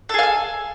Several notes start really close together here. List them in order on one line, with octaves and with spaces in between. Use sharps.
A4 G#4 F5 G#5